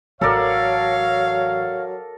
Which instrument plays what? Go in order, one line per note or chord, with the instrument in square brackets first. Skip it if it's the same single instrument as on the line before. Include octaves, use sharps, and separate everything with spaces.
[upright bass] A1 [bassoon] F#3 [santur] A4 A#4 D5 [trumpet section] C#5 F5